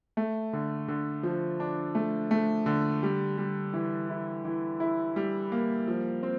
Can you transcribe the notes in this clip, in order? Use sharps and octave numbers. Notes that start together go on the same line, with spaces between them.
A3
D3
D3
F3
D4
A3
A3
D3
G3
G3
E3
E4
E3
E4
G3
A#3
F3
C4